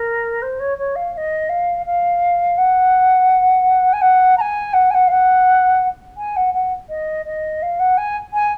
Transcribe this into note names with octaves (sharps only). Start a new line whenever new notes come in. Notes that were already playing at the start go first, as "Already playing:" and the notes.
Already playing: A#4
C5
C#5
C#5
F5
F5
D#5
F5
F5
F#5
G#5
F#5
A#5
G#5
F#5
G#5
F#5
F5
F#5
G#5
F#5
F#5
D#5
D#5
F5
F#5
G#5
G#5